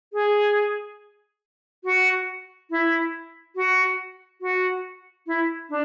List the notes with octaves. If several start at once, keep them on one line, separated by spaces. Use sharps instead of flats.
G#4
F#4
E4
F#4
F#4
E4
D4